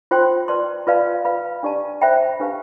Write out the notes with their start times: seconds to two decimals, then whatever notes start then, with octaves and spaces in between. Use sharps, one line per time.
0.11 F4 C5 G5 C6
0.48 B4 D5 A5 C6
0.87 F4 B4 D5 F5 A5
1.25 B4 F5 B5
1.63 D4 G4 D5 A5
2.01 C5 E5 G5 B5
2.40 D4 G4 B4 F5 A5